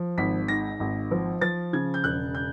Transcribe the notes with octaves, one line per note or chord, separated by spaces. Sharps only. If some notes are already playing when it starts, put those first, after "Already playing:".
Already playing: F3
G#1 B6
G#2 A#6
G#1
F3
F3 A6
C#3 G#6
G6
E1 F#6
G6